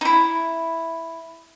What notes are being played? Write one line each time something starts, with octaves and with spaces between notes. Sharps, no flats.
D#4 E4